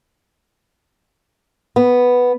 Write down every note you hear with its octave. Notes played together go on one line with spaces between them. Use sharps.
B3